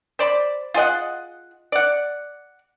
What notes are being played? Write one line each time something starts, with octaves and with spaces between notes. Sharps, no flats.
C5 D5 B5
F4 G#4 D#5 F#5
D5 F#5